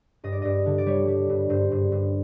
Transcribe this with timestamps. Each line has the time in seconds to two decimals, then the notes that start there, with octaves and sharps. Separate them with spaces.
0.24 G2 D#5
0.32 D5
0.42 G2 D#5
0.66 D3
0.78 D5
0.86 G3 C#5
1.08 G3
1.29 G2
1.50 G2 C5
1.71 G2
1.92 G2